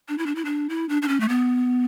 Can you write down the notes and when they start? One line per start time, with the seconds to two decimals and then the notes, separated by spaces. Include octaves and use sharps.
0.09 D4
0.18 E4
0.26 D4
0.35 E4
0.45 D4
0.70 E4
0.89 D4
1.02 D4
1.08 C#4
1.20 A3
1.29 B3